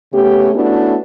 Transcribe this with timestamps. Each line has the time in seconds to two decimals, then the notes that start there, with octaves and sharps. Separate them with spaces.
0.13 C#3 A3 B3 C#4 G4
0.54 A3 B3 C#4 D4 E4 F#4